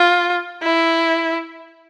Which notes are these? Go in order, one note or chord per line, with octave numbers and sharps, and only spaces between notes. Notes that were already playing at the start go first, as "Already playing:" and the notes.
Already playing: F4
E4